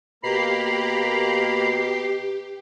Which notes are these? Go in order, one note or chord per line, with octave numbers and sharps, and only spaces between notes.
B2 A#3 G4 A#5 B5 C7